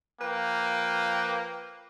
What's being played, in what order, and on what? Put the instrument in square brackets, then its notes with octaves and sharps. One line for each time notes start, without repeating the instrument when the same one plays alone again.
[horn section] F3 B4 G5 [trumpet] A#3